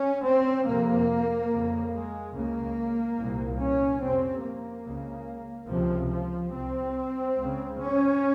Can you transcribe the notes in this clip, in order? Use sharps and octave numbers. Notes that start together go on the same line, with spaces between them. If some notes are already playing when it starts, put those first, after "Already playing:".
Already playing: C#4
C4
F2 C3 A#3
F2 C#3
G#3
C#2 C#3 A#3
C2 A#2
C#4
F2 C3 C4
A#3
C#2 C#3
C#2 C3 F3
F3
C2 C3 C4
C#2 C#3
C#4